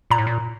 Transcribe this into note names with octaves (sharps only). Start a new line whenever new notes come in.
A#2 A#5
A2
A#2